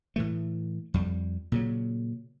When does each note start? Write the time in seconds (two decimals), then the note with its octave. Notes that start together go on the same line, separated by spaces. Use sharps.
0.16 A2 E3 A3
0.94 F2 G3
1.52 A#2 C#3 F#3